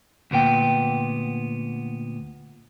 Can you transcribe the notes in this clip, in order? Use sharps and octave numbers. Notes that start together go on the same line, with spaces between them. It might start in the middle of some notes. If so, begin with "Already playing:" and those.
D2 A#2 B3 G5